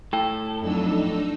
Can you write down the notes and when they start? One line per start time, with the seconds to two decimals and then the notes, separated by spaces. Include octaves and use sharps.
0.13 A2 A4 G5
0.61 F2 F#3 D4 D#4 E6